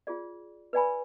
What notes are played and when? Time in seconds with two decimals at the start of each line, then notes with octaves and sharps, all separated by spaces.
0.07 F4 G#4 D5
0.73 B4 D5 G#5 B5